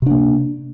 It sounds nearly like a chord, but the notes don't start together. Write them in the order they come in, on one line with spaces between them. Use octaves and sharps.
C3 D4 A#3